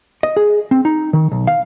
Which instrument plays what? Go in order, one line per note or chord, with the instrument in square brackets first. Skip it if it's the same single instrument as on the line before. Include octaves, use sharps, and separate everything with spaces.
[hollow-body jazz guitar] D#5
G#4
C4
D#4
D#3
B1
F5